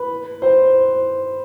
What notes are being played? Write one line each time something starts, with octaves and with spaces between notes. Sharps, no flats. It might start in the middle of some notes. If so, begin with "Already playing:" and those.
Already playing: B4
C5